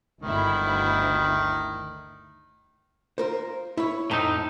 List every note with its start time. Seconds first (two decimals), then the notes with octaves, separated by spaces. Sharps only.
0.22 G1 D2 D#3 E4
3.18 F4 A#4 C5
3.77 E4 C#5
4.11 F2 A2 D#4 A#5